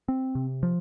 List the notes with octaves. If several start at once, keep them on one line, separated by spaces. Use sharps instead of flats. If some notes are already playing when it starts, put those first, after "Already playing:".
C4
C3
F3